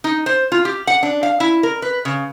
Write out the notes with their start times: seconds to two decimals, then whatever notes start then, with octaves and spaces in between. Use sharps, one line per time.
0.04 D#4
0.26 C5
0.52 F4
0.65 G4
0.87 F#5
1.03 D4
1.23 F5
1.40 E4
1.63 A#4
1.82 B4
2.05 C#3